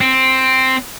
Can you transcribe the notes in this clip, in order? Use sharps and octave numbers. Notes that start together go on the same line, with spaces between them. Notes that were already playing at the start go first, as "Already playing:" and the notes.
C4